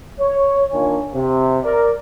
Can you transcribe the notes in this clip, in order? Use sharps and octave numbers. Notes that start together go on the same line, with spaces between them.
C#5
D#3 A#3 D4 F4 C#5 G#5
C3
A#4 D5